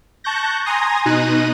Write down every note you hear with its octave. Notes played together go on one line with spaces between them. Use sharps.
A5 C#6 F#6 G6 A#6
G#5 A#5 C6 D#6 A#6
B2 D#4 F#6 A#6 D#7